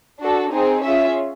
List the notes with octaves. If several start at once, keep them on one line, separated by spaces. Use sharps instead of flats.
D4 F#4 A4
C4 D#4 G#4
C#4 F4 G#4 E5